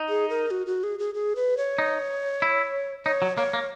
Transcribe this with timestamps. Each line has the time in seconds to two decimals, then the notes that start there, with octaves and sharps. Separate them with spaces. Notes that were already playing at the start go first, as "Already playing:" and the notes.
Already playing: D#4
0.09 G#4
0.30 A#4
0.51 F#4
0.67 F#4
0.83 G#4
0.99 G#4
1.14 G#4
1.36 B4
1.57 C#5
1.78 D#4
2.42 E4
3.06 D#4 C#5
3.22 F#3
3.37 A#3 C#5
3.53 A#3